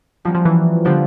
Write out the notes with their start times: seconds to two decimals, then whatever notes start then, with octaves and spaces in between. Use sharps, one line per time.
0.25 F3 G3 A#3 C#4 F#4
0.35 F3
0.45 E3
0.85 D3 F3 G3 B3 D4 G4